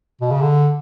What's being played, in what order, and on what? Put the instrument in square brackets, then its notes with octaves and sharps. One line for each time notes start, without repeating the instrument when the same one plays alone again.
[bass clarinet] B2
C#3
D3